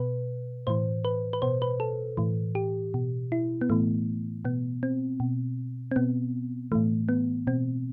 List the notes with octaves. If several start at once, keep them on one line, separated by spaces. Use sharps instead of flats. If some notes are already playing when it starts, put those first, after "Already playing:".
Already playing: B2 B4
A2 E3 C5
B4
B4
B2 C5
B4
A4
A2 E3
G4
B2
E4
B3
A2 E3 A3
B2 B3
C4
B2
C4
B2 B3
A2 E3 A3
B3
B2 C4